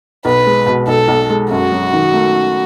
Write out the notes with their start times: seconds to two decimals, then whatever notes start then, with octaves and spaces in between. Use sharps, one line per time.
0.25 B1 B4
0.46 G#3
0.66 B2
0.87 B1 A4
1.08 B1
1.30 G#3
1.51 F#2 F#4
1.72 F#3
1.93 D#3
2.14 A3